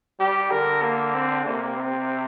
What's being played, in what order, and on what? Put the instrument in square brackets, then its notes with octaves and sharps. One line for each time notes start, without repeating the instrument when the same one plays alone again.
[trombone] G3 [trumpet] G4
[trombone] D3 [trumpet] A#4
[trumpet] A#3
C4
[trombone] C3 [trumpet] A#3
[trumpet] C4